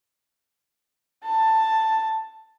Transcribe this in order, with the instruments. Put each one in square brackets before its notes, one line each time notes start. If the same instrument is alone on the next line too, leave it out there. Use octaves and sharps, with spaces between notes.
[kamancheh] A5